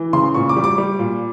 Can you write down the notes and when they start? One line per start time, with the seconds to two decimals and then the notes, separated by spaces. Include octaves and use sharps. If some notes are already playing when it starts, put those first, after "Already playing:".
Already playing: E3
0.13 C#3 C6
0.34 A#2 C#6
0.49 D6
0.57 G3
0.64 D6
0.78 G3
0.99 A#2